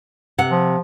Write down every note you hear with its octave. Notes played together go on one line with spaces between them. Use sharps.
C3 F#5
F3